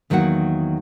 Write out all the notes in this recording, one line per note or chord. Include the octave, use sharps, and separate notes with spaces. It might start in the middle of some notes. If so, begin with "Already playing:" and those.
E2 D#3 F#3 A#3 F#4 F#5